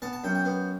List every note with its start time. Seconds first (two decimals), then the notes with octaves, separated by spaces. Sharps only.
0.02 B3 A5
0.13 A5
0.24 F#2 G5
0.35 G5
0.45 B3